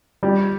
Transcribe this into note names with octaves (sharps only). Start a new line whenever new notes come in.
G3